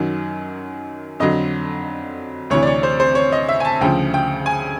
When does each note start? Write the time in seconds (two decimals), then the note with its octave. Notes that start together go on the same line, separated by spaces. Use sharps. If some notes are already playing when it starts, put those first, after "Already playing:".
Already playing: F#2 D#3 F#3
1.20 F2 D3 F#3 D#5
2.50 D2 C3 E3 C#5
2.63 D5
2.67 C#5
2.83 C5
3.00 C5
3.15 C#5
3.32 D#5
3.49 E5
3.60 G#5
3.65 A5
3.81 D2 C#3 F3 G5
4.14 G5
4.46 G#5